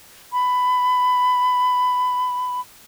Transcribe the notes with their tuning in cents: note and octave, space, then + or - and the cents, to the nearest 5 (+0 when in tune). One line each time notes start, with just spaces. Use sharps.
B5 +15